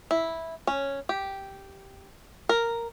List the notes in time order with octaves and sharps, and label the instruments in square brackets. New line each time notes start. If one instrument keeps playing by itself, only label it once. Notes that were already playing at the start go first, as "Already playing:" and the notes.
[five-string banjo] E4
C#4
G4
A#4